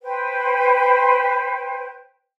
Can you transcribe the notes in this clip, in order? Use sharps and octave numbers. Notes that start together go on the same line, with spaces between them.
B4 C5 G5